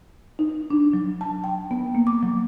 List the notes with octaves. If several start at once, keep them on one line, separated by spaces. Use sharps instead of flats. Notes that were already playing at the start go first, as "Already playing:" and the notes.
D#4
D4
F#3
A5
G5
B3
A#3
D6
F#3